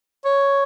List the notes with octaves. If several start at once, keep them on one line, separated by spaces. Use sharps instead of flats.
C#5